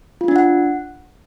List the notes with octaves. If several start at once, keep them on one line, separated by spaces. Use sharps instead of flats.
F4
D4
F#5